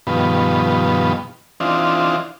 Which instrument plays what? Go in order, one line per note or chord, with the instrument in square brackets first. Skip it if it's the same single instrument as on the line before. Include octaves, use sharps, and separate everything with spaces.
[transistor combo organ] G2 B2 D#3 F3 B3
E3 C4 D4 D#4 F4